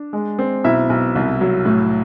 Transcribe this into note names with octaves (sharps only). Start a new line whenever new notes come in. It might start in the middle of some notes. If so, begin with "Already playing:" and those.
Already playing: D4
G#3
C4
B1 E4 E5
B1
C2
F#3
A2